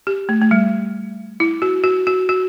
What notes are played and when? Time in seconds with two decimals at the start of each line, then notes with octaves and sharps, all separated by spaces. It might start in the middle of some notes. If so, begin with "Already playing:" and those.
0.07 G4
0.29 A3
0.42 A3
0.51 G3
1.40 E4
1.62 F#4
1.84 F#4
2.07 F#4
2.29 F#4